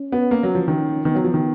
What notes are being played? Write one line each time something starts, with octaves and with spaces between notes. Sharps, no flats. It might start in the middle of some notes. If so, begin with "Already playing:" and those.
Already playing: C#4
B3
A#3
F#3
F3
D#3
D#3 B3
F#3
F3
D#3